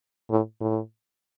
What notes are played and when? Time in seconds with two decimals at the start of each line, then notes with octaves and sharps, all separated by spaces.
0.30 A2
0.61 A2